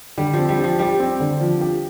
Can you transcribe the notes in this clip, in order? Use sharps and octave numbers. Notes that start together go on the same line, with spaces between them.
D3 G3
F3
C4
G3
F3 G4
G3 G4
C4
D3
F3
G4